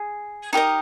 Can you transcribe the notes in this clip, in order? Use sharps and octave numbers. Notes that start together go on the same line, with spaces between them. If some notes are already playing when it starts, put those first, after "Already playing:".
Already playing: G#4
D#4 G4 A#4 D#5